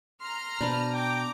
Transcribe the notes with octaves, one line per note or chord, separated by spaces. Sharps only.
A#5 C6 F6
B2 D4 B4 C5
G5 A#5 D6